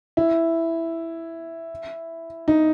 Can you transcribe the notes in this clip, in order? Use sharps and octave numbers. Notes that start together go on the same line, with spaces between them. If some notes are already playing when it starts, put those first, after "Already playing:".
E4
D#4